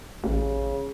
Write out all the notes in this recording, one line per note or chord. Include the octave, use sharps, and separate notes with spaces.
A1 C#3